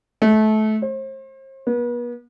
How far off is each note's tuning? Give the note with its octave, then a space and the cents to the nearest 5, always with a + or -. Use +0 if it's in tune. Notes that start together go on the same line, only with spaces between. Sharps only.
A3 -25
C5 +40
B3 -40